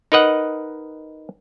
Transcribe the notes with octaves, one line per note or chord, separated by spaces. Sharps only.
D#4 A#4 B4 D#5 F#5